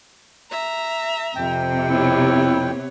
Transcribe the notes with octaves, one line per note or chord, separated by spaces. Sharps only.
E5 A#5
F2 C3 G5
B3 E4 C#5